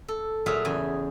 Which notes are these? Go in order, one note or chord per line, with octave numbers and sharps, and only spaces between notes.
A4
A#2 F#3 A3 G#4 E5 F5
E2 C#3 G#5